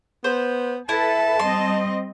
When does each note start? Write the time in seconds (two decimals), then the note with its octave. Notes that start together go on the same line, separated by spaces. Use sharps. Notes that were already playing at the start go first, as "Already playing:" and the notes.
0.24 B3 C5
0.89 E4 A4 B4 A5
1.39 G3 C4 D#5 C6